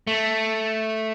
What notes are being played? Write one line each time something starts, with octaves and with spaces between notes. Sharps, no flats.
A3